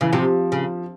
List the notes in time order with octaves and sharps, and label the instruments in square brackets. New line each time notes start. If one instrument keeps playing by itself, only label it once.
[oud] C#3 [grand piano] E3
[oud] C3 [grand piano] F3
[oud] C#3